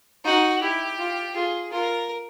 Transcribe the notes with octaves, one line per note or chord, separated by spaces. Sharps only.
D#4 F#4
E4 G4
F4
F4 G#4
F4 A#4